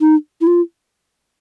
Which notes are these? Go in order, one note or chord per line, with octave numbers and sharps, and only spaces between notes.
D#4
E4
F4